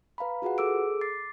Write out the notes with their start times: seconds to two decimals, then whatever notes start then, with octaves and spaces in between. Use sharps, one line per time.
0.18 B4 F5 A#5 B5
0.42 F4 F#4 G#4 B4 F#5
0.58 G#4 A4 D6 E6 D7
1.01 D6 A6 C7